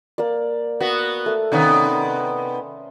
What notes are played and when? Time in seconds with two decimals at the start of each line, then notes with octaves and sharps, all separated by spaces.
0.18 A#3 D5
0.80 B3 F#4
1.26 A3 A4 A5
1.52 C3 D#3 B3 C#4 C5 D5